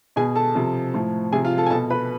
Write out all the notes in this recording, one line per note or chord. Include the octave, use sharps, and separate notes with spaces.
B2 G#4 G#5
A4 A5
C3 F3
A2 F3
C3 F3 G#4 G#5
F4 F5
A4 A5
G#5
B2 A4 A5
B4 B5